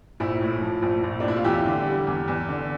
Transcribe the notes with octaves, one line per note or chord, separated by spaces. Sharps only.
A#1 E4
A2
F3
A#1
A#1
D4
A2 E4
F4
E2 E4 G4
D3
G3
E2
E2
D3